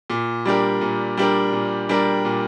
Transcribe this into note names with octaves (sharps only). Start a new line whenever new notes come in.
A#2
G3 D4 G4 A#4
A#2
G3 D4 G4 A#4
A#2
G3 D4 G4 A#4
A#2